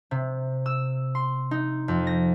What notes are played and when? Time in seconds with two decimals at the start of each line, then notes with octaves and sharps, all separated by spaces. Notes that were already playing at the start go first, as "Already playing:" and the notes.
0.11 C3
0.66 E6
1.15 C6
1.51 D#4
1.88 F2
2.07 A#6